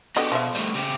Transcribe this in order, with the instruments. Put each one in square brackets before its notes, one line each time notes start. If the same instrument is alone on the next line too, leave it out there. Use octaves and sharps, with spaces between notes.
[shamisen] D3 B3 D#5 [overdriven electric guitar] F#4 G4
[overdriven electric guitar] B2 [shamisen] F3 E5
[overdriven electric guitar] G3 A3
C#3 G4